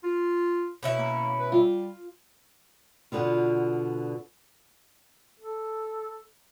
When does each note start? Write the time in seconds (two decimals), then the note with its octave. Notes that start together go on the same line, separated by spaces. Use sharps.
0.04 F4
0.83 B2 C#4 E4
0.98 A#3
1.40 B4
1.52 G3 F4
3.12 B2 D3 B3 F4
5.40 A4